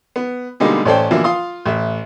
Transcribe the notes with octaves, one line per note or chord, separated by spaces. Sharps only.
B3
B2 D3 G3 G#3 A#3 D#4
A1 C#4 A4 C5 D5 G5
B2 D3 E3 F3 A#3 E4
F4 F5 C6 D#6
A1 E5